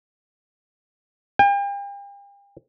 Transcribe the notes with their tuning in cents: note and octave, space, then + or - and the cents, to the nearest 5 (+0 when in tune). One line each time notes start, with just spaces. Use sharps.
G5 +40